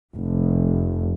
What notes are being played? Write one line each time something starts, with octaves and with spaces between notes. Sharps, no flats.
F1